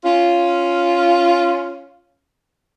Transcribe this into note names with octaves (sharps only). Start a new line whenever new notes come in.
C#4 F4